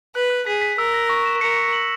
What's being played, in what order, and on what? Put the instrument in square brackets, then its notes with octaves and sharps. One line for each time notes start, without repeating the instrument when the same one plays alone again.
[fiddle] B4 [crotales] F#6
[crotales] F#6
[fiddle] G#4 [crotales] B6
[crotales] B6
[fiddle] A#4 [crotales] E6
[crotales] A#6
C#6
E7
[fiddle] A#4 [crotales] C#7
[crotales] C#6
F#7